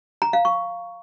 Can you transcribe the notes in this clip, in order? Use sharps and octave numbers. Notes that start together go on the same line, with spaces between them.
A#5
F5
C#6